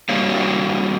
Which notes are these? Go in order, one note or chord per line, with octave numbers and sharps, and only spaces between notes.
G3 A#3 D4 F#4 C#5 F5